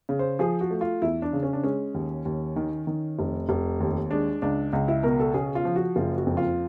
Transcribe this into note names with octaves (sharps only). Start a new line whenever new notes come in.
C#3
C5
F3 G#4
F#4
A3
F4
E2 E4
D4
C#3
C#4
D4
G#3 C#4
D#2
D#2
D#3
D#3
F1
F1
D#2
G#3 D4
C#2 D4
C#2
E4
B2 A#4
A4
C#3 G#4
F4
F3
F#4
F#1 F4
F#4
F2
F4